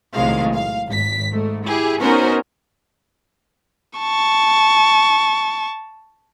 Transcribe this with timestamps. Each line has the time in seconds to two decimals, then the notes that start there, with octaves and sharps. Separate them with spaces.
0.14 B1 A2 C3 D#3 G#3 F5
0.54 F5
0.87 G#1 B6
1.33 G#2 A3
1.66 E4 G4 G#4
2.01 B3 C#4 D#4 F#4 A#4 C5
3.99 A5 C#6